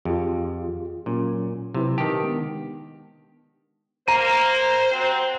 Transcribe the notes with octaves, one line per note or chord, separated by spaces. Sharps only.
F2 F4 G4 G#4
A#2 F#3 C#4
C3 F#3 E4 B4
D#3 G4 A5
G#3 B3 D4
A#3 C5 A#5 D#7
C3 F#3 C4